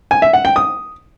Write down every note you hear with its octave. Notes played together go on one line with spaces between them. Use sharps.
G#5
E5
F#5
G5
D#6